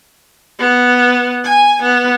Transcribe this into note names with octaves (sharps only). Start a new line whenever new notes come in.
B3
G#5
B3